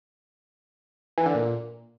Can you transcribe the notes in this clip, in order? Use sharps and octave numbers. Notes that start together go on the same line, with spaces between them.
E3
D3
A#2